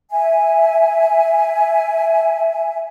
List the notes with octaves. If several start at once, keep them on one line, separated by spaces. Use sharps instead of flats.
E5 G#5